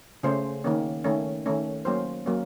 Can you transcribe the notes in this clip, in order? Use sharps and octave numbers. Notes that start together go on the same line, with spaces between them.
C#3 A3 C#4 C5
D#3 A#3 C#4
D#3 A3 C#4
D#3 A3 C#4
F#3 A#3 C#4 C5
F#3 A#3 C#4